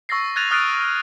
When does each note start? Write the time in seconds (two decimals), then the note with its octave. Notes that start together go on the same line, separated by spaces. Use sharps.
0.09 C#6 E6 A6 A#6 C7
0.36 F6 F#6 G#6 A6 D#7 F7
0.51 D#6 F6 F#6 A6 C7 D7